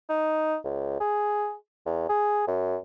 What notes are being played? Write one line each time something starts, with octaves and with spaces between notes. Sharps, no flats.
D#4
C#2
G#4
E2
G#4
F#2